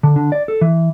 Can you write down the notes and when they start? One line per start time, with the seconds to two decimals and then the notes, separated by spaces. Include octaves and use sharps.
0.03 D3
0.16 D3
0.32 D5
0.48 A4
0.61 E3